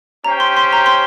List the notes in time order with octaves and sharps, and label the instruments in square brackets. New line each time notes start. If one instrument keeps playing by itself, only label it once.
[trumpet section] C#4 G4 C5 G5 [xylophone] A#5
[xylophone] C6
C6
A#5
C6